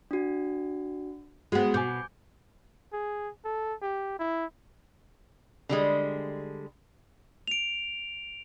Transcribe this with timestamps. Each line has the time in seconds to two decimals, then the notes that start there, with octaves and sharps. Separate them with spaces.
0.11 D4 F#4
1.52 G#3 B3 F#4
1.74 B2 G#5 D6 G6
2.93 G#4
3.45 A4
3.82 G4
4.19 E4
5.69 D3 G3 G#3
7.48 D7 F7